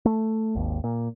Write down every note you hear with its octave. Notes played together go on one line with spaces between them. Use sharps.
A3
G#1 D#2
A#2